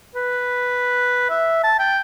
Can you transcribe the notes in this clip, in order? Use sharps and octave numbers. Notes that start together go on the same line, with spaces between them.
B4
E5
A5
G5